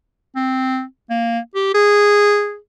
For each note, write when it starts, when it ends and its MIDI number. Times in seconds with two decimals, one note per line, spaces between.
0.36 0.83 60
1.10 1.39 58
1.55 1.72 67
1.74 2.56 68